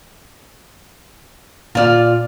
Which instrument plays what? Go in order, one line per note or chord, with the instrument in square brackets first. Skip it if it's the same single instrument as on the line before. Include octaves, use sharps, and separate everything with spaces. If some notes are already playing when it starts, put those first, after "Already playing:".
[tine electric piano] A#2 F6 [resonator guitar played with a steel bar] F4 D5